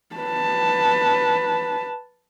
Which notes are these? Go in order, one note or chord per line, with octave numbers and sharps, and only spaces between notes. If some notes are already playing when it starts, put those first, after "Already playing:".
B4 A5